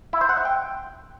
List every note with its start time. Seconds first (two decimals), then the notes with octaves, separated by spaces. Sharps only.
0.13 E4
0.21 C5
0.29 F#5
0.37 E5
0.45 G5